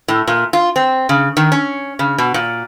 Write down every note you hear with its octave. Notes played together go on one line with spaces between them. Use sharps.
A2
A#2
F4
C4
C#3
D#3
C#4
C#3
B2
A#2